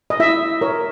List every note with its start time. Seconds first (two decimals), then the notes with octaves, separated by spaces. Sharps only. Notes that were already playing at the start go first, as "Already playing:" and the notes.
0.10 D#5
0.20 E4 E5
0.61 A#4 C#5